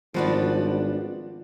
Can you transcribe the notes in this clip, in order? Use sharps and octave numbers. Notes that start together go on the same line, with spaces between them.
G#1 F3 G3 B3 D4 F#4 D5